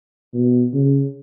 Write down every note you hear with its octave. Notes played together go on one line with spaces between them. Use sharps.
B2
C#3